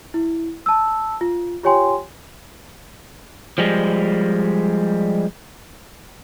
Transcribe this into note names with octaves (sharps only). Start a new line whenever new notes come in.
E4
A5 E6
F4
F4 G4 C#5 G5 G#5 C6
F3 G3 G#3